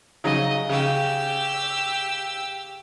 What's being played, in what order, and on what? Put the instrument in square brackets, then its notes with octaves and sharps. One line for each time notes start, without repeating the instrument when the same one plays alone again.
[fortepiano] C#3 F#3 D#4 [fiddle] D#5
[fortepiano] C#3 [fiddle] G4 E6